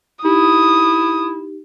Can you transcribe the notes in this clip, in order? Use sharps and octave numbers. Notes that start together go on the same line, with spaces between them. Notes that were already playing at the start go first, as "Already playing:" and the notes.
D#4 E4 G4 D#6